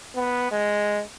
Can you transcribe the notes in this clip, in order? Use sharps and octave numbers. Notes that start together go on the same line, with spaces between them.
B3
G#3